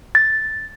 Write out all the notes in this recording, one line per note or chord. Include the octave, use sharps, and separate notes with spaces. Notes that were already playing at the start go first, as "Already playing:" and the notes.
A6